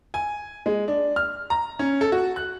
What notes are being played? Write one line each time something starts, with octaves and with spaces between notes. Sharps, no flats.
G#5
G#3
D4
F6
A#5
C#4
A4
F#4
F#6